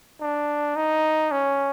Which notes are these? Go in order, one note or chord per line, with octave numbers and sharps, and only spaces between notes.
D4
D#4
C#4